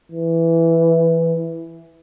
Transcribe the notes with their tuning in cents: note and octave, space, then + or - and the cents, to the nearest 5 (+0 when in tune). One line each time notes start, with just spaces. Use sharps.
E3 +5